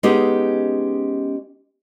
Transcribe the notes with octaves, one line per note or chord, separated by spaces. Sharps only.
G#3 B3 C#4 D#4 G4 G#4